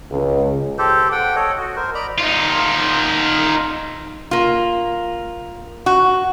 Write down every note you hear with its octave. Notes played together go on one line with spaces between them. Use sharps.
C#2
G4 A4 C5
F#5 G5
A4 C#5 D#5
F#4 D#5
A#4 C5
D5 D#5 A#5 B5
D#4 F4
A#3 F4
F#4